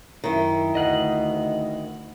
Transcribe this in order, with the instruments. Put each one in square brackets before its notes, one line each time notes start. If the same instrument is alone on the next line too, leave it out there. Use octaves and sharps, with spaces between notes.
[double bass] F#2 [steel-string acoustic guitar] D#3 E4
[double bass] D2 [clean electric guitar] D#5 F#5